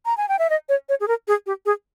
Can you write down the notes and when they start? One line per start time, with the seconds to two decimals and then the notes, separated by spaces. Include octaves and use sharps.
0.06 A#5
0.17 G#5
0.29 G5
0.39 E5
0.50 D#5
0.69 C#5
0.89 C#5
1.00 G#4
1.08 A#4
1.28 G#4
1.46 G4
1.66 G#4